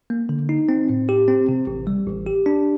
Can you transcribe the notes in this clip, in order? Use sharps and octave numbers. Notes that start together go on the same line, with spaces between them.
A#3
D3
D#4
C4
A2
G4
C4
C3
A1
G3
A1
G4
D4